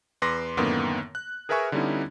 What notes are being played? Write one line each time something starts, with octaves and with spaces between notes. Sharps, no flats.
E2 B4 C6 D6 A#6
F#2 A2 D3 D#3 A#3 B3
F#6
G#4 A#4 B4 E5 G#5 C#6
D3 G3 B3 C#4 D#4 E4